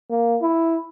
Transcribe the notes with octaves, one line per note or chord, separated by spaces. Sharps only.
A#3
E4